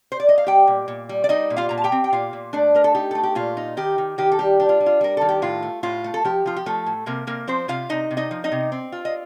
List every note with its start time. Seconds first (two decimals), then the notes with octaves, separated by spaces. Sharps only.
0.12 C5
0.20 D5
0.29 D#5
0.38 F5
0.47 G3 G4 G5
0.67 A#2
0.88 A#2
1.09 G3
1.24 D5
1.29 G3 D#4 D#5
1.50 A#2
1.56 F4 F5
1.69 A#2 A#5
1.78 A5
1.84 G4 G5
1.92 C4
2.04 G5
2.13 A#2 F4 F5
2.33 A#2
2.53 A3 D4 D5
2.75 A3 A#4
2.84 A4
2.95 D#4 G4
3.11 A3 A4
3.23 G4
3.35 A#2 F4
3.57 D#4
3.77 D#3 G4
3.98 D#3
4.18 D#3 G4
4.32 A4
4.39 G3 G4
4.60 D4 G4
4.69 F4
4.80 G3
4.86 F4
5.01 G3 A#4
5.17 D#3 A4
5.29 G4
5.42 A2 F4
5.63 A3
5.83 A2 F4
6.04 A3
6.14 A4
6.25 F3 G4
6.46 F3 F4
6.56 G4
6.66 F3 A3 A4
6.86 A2
7.06 C3 A#3 A#4
7.27 C3 A#3 A#4
7.47 F3 C4 C5
7.68 C3 F4 F5
7.89 C3 D#4 D#5
8.11 C3
8.17 D#4 D#5
8.31 F3
8.44 D#4 D#5
8.52 C3
8.72 C4
8.92 F4
9.05 D#5